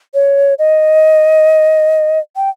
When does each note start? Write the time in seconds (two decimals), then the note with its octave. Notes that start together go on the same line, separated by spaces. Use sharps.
0.14 C#5
0.59 D#5
2.36 G5